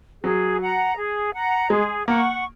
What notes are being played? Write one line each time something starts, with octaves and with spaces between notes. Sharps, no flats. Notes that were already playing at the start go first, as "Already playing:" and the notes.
F#3 G#4
F#5 A#5
G#4
F#5 A#5
G#3 G#4
A#3 F#5 C#6